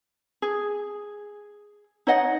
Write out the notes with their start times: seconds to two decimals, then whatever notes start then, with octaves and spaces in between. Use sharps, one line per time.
0.42 G#4
2.07 D#4 C#5 D#5 F#5